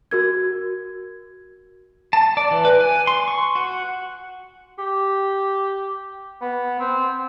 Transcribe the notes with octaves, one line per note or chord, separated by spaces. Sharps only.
F#4 A#4 G#6
A5
D5
E3
B4
G#5
C6
C#6
F#4
G4
B3
C4